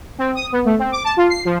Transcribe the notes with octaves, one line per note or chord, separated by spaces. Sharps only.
C4
D#6
B3
A3
C4
D6
A5
F4
C7
F3